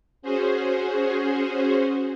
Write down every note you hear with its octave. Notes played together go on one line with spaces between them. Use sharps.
C#4 F#4 G#4 C5